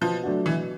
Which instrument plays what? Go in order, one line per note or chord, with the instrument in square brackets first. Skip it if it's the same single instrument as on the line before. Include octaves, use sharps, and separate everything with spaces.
[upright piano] B2 [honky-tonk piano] F3
[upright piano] F#3 A3 D4 F#4
[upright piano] B2 [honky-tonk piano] E3